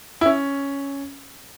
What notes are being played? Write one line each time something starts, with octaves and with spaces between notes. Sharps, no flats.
E4
C#4